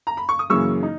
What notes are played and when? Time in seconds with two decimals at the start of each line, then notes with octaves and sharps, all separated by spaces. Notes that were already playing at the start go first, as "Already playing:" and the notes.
0.07 A#5
0.17 B5
0.29 C#6
0.39 D#6
0.50 F#2 C#3 E3 A#3 C#4 C#6 E6
0.83 D#4